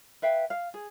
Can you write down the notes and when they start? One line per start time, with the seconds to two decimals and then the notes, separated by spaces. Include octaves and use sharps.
0.22 B4 E5 F5 G5
0.50 F5
0.74 G#4